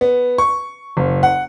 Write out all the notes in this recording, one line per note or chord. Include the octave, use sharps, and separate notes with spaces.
B3
C#6
F#1
F#5